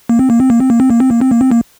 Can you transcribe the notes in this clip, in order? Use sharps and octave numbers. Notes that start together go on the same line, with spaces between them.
A#3
C4
A#3
C4
A#3
C4
A#3
C4
A#3
C4
A#3
C4
A#3
C4
A#3